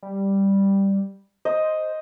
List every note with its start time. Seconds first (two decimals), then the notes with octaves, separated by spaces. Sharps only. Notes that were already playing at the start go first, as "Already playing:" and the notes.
0.03 G3
1.45 C5 D#5